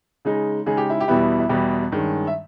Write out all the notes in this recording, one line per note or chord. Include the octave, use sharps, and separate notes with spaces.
C#3 G#3 D#4
C#3 G#3 D#4 G#4
G4
E4
G4
E2 B2 G3 B3 E4
E4
E2 B2 G3 B3 E4 G4
G2 D#3 G#3 C#4
E5